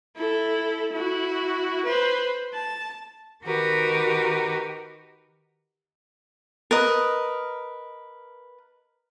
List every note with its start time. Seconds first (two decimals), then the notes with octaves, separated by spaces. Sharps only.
0.17 E4 A4
0.93 E4 F#4
1.85 B4 C5
2.54 A5
3.44 D#3 F#4 G4 A#4 B4
6.71 A#4 B4 D#5